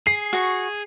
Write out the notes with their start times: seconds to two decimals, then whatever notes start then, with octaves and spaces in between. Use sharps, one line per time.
0.07 G#4 C7
0.33 F#4 C#6